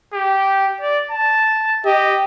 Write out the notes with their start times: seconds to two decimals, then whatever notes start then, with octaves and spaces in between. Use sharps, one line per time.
0.14 G4
0.81 D5
1.11 A5
1.85 G4 D#5